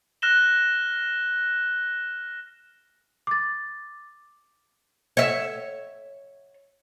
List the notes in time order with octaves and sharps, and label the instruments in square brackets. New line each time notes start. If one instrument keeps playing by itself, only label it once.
[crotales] F6 F#6 A#6 E7 G7
[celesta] D6 A6
[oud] C#5 E5